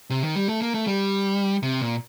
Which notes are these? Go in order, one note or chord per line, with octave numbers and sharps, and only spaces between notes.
C3
D#3
G3
A3
A#3
A3
G3
C3
A#2